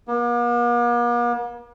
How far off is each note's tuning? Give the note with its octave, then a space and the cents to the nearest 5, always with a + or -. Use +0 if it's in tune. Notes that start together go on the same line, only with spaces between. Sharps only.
A#3 +45